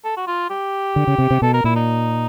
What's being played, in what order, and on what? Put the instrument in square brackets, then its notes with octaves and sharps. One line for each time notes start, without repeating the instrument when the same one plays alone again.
[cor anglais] A4
F#4
F4
G4
[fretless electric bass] D3
C#3
C3
C3
[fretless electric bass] B2 [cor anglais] A4
[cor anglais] A#4
[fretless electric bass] A#2 [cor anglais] E4
[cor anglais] D#4